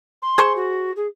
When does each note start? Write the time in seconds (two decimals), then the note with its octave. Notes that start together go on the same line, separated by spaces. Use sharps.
0.22 C6
0.38 G#4 C5 C#6
0.56 F#4
0.96 G#4